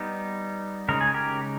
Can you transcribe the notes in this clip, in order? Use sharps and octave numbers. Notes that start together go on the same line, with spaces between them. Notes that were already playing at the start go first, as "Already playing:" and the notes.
Already playing: G3 B3 D#4
C#3 G#3 D#4 A#4
G#4
G4 A#4